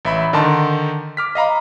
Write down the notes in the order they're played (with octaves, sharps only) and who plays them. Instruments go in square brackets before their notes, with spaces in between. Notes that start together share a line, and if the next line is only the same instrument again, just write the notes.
[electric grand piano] A1 E5 B5
D3 D#3 D#4 D5 A5 C6
D6 F6 B6
D#5 F5 A#5 B5